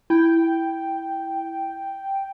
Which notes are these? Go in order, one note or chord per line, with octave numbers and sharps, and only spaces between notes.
E4 G5